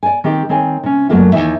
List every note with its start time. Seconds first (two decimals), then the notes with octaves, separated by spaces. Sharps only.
0.03 D5 G#5
0.24 D#3 C4 G4
0.49 D#3 C4 C#5 G#5
0.83 C3 C#4
1.09 F#2 F#3 A3 A#3 F4 E5
1.33 D#2 A#2 E3 D#4 E5